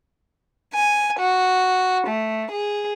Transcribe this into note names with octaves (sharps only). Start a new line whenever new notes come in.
G#5
F#4
A3
G#4